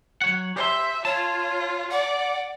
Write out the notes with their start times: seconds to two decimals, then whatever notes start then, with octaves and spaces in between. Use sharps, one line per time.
0.22 F#3 C#5 F#5
0.56 G4 C5 E5 C6
1.05 F4 C#5 A5
1.91 D5 F#5